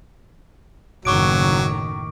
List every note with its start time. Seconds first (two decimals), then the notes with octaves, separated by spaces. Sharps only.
1.05 F#1 A2 D#3 F#3 C#6 D6 D7